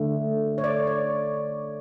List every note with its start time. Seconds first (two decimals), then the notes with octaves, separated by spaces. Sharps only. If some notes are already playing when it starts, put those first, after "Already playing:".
Already playing: D3 A3
0.58 C#5
0.64 D5
0.87 C#5